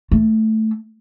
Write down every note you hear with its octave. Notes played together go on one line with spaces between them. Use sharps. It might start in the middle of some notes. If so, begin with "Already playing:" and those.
A3